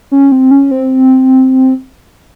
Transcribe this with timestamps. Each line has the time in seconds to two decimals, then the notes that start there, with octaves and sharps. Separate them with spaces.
0.12 C#4
0.32 C4
0.51 C#4
0.71 C4